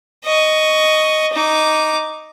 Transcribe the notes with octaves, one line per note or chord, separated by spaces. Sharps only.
D#5 C#6
D#4 D6